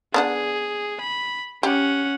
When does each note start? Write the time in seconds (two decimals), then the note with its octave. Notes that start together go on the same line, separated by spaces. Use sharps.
0.14 B3 D4 G#4 F#5
1.01 B5
1.63 C#4 G4 F#5